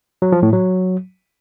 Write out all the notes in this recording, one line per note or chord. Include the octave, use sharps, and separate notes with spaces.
F#3
F3
A2
F#3